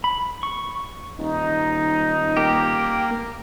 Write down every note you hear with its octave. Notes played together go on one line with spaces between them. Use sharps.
B5
C#6
D#1 D#4
A#3 G4